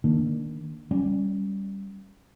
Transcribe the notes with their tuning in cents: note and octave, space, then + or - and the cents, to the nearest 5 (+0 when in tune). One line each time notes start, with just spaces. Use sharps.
D#3 -5 A#3 +0 D4 +0
G3 +0 C#4 +0